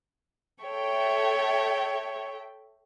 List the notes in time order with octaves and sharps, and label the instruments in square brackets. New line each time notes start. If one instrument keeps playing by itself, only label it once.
[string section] A4 E5 G5 [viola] C#5